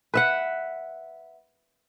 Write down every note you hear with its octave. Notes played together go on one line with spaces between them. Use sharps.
B4 E5 F#5